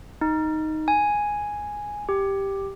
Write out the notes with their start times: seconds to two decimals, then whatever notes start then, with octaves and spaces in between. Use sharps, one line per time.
0.21 D#4
0.88 G#5
2.09 G4